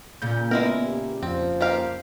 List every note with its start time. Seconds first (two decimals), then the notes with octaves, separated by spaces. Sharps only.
0.22 A#2 C#3 G6
0.51 G#3 B3 E4 A#4
0.84 G4
1.23 F2 F3 C4
1.61 A#3 G4 F5